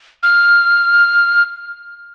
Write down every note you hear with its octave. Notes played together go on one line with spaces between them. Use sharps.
F6